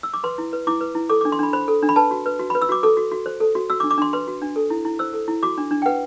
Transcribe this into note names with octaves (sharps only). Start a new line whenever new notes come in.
E6
D6
B4 C6
E4
B4
E4 D6
B4
E4
A4 D6
D4 D6
C6
D4 B5
C5 B5
A4
D4
B5
B4 A5
F#4
B4
F#4
B5
B4
E6
F#4 D6
A4 D6
F#4
F#4
C5
A4
F#4
F#4 E6
D6
D4
D6
D4 C6
B4 C6
F#4
D4
A4
E4
E4
C5 E6
A4
E4
F#4 D6
D4
D4
G5
B4 F#5